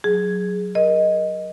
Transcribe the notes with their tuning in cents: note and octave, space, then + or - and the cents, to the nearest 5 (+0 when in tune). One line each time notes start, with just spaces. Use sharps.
F#3 +0 G#4 +0
A#4 +25 D#5 +0